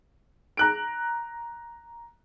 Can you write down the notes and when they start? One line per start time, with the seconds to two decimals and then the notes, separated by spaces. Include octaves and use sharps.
0.57 A#5 F#6 D7